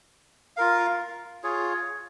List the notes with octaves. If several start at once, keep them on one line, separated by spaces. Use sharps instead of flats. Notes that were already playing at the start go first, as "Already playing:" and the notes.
F4 A#4 F5
F4 G#4 C#5